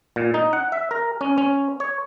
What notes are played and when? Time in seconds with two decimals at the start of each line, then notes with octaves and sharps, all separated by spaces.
0.16 A#2
0.34 D#4
0.53 F#5
0.72 E5
0.91 A#4
1.21 C#4
1.38 C#4
1.80 C#5